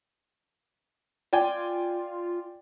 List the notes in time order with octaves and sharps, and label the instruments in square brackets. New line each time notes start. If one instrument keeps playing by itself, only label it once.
[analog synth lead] F4 [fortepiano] D5 G5 G#5